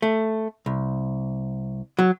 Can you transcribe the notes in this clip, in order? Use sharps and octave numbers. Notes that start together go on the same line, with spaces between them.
A3
C2
F#3